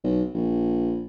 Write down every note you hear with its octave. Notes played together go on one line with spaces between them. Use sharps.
B1
A#1